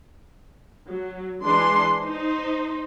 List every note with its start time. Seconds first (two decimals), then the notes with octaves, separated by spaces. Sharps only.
0.87 F#3
1.44 E3 G#3 D4 C6
2.00 D#4 C5